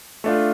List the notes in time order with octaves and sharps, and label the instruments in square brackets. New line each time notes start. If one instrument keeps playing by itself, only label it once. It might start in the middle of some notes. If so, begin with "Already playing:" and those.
[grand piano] A3 D4 F4